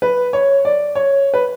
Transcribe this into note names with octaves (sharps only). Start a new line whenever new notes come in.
B4
C#5
D5
C#5
B4